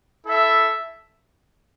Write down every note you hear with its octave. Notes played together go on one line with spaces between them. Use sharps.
E4 A4 E5